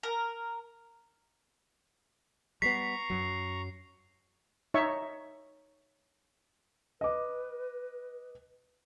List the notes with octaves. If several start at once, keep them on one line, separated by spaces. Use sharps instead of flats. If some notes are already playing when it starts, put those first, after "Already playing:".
A#4
G3 G#3 B3 A#5 C#6 B6 C7
F#2 F#3
D#4 C#5 E5 C#6
B4 D#5 D6